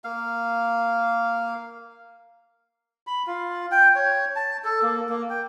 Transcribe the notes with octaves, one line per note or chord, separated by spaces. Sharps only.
A#3 F5
B5
F4
G5
C#5
A5
A4
A#3
A#3
G5